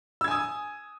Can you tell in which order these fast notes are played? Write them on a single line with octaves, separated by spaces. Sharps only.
E6 G#6 G#5 D#6